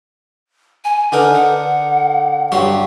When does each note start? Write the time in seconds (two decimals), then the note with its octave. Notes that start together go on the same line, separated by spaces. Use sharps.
0.84 G#5
1.12 D3 D#4 A#4 B4
1.35 F#5
2.52 G2 F#3 G4 C6